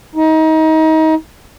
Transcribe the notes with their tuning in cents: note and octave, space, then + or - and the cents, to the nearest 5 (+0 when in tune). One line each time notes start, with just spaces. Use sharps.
D#4 +30